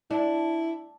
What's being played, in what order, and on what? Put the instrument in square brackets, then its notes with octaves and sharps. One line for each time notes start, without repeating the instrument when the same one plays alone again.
[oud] D4 [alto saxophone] E4